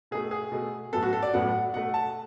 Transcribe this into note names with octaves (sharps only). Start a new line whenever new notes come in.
B2 A3 G#4
G#4
B2 A3
A2 F#3 B3 A4
F#4
A4
D5
A2 F#3 B3 F#5
B2 A3 F#5
A5